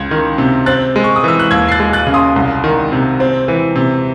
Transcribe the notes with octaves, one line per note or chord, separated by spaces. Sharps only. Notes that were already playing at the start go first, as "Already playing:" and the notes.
Already playing: C#2 G#6
D#3
C3
C4 F#6 A6
G#3
C#6
D#6
E3 E6
F#6
D#2 E6 G#6
C7
F#6 A6
G#3
F#6 A6
C#3
C6 D#6
C2
D#3
C3
C4
E3
C3